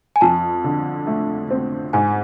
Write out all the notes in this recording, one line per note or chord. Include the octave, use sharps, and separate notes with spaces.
G#5
F2 A5
D3
A3
C4
G#2 G#5